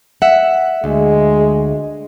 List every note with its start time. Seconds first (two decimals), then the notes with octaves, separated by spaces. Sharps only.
0.22 E5 F#5
0.84 D2 G#3